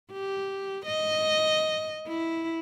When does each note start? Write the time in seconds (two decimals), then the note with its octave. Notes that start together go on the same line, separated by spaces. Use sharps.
0.12 G4
0.86 D#5
2.07 E4